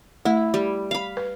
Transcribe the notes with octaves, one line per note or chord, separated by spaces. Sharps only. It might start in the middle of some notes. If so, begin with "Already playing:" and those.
A3 E4
G3
F5 B5
B4